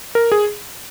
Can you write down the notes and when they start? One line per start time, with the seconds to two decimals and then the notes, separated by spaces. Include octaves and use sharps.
0.15 A#4
0.32 G#4